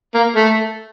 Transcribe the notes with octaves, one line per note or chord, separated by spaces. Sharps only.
A#3
A3